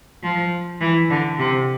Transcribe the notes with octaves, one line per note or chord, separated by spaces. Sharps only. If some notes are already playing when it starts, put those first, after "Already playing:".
F3
E3
D3
C3